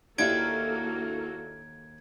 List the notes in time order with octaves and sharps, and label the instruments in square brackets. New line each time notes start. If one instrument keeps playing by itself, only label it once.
[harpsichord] D#2 [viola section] A#3 F#4 A4 [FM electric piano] D4 E4 [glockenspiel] G#6 D7